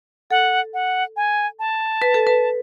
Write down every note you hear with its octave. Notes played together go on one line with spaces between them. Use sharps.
A4 F#5
F#5
G#5
A5
B4
A4
B4